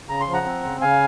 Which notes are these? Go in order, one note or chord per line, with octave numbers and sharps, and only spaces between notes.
C#3 A#5
C6
F3
F#5 A#5
C4
C#3
C#3 F5 G#5